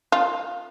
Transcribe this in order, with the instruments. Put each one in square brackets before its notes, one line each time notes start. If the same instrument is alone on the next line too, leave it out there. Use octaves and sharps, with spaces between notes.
[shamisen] F4